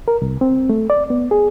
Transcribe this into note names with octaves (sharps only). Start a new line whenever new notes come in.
A#4
C2
C4
A3
D5
B3
G#4